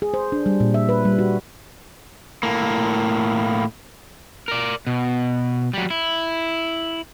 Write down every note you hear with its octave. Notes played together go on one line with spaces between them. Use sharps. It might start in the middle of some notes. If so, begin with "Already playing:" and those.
G#4
C5
D4
G3
A#2
E5
B4
G3
F#4
A2 A#3
A#4 D5
B2
F#3 G3
E4